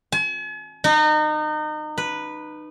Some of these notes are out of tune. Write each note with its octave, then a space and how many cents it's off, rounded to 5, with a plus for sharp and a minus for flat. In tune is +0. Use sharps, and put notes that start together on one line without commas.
G#5 +45
D#4 -30
B4 -5